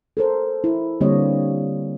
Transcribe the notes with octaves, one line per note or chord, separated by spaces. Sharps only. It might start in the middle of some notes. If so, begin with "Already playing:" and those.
A4 A#4 C5
E4
D3 G3 A#3 C4 C#5 D#5